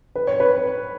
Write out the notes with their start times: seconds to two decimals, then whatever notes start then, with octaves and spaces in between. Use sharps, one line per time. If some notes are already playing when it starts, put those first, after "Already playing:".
0.15 B4
0.27 C#5
0.40 B4